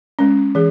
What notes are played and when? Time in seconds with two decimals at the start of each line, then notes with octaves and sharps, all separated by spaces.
0.19 G#3 C#4
0.55 E3 G#4